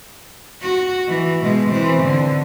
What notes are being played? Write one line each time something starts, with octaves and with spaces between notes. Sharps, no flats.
F#4
E3
B2 G#3
E3 C4
D3